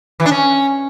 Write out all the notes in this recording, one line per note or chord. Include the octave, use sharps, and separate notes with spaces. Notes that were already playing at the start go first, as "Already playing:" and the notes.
E3
D4
C#4